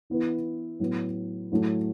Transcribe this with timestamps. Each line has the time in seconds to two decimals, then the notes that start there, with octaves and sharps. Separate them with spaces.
0.10 E3 B3 E4
0.80 A2 F#3 B3
1.52 A2 F#3 A3